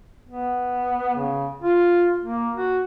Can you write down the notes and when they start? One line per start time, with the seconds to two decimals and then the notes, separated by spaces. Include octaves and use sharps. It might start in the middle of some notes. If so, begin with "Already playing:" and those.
0.28 B3
1.16 C#3
1.62 F4
2.23 A#3
2.57 F#4